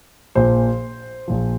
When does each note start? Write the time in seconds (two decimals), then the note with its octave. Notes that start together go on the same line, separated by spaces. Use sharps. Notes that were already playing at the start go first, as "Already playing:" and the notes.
0.35 A#1 A#2 F3 C5
1.28 A#1 A#2 F3